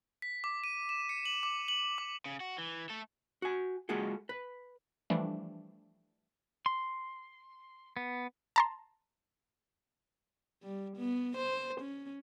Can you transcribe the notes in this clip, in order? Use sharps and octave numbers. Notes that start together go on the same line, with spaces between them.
B6
D6
D#7
E7
C#7
F#7
D6
F#7
D6
C#3
F#4
E3
A3 A4
F#4 G#5
G#3 A#3 F4 F#4 G#4 A4
B4
E3 F3 G3 A3 D4
C6
B3
A5 A#5 C6
G3
B3
C5
C#4